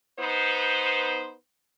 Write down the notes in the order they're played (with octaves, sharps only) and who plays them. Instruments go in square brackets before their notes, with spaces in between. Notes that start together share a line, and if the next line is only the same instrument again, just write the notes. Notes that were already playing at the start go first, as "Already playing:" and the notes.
[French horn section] B3 D#4 B4 C5